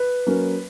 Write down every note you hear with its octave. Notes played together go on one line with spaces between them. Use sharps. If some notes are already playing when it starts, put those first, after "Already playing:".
Already playing: B4
F#3 A#3 C#4